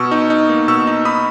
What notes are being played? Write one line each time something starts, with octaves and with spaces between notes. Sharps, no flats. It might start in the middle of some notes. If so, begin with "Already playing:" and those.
Already playing: B2 C#6 E6
D#4
D#4
A#3
B2 C#6 E6
D#4
D#4 B5 D#6